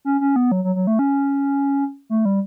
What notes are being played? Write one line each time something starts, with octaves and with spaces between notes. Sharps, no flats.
C#4
C#4
B3
F#3
F#3
F#3
A3
C#4
A3
G3